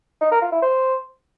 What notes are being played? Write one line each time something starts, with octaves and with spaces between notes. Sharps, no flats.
D#4
A#4
F4
E4
C5